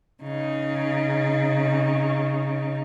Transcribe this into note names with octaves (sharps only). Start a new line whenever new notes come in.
C#3 D#4